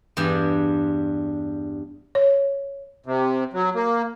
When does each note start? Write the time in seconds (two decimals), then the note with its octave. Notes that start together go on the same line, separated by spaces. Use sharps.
0.17 E2 G2 G3 D4
2.15 C#5
3.06 C3
3.53 F#3
3.75 A#3